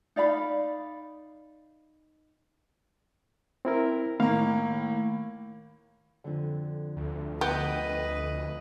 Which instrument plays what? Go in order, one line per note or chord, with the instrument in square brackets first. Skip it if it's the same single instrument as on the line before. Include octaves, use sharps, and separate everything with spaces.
[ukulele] D#4 D5 F5 B5
[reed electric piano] C4 E4 A#4
[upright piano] A2 A#3 [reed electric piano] D#3 F5
[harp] F2 D3
[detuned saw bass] D2
[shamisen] B3 G4 [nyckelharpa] B4 D#5